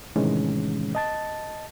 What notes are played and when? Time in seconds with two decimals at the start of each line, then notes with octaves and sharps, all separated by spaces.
0.16 A2 C3 D#3 E3 G#3 C#4
0.95 D#5 A5 A6